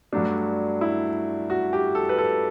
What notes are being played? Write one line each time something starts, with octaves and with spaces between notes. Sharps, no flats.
G2 F#3 A3 D4
E4
F#4
G4
A4
B4
A4